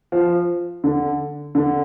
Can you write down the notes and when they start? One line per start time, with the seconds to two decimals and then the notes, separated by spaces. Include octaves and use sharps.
0.12 F3
0.84 D3
1.55 D3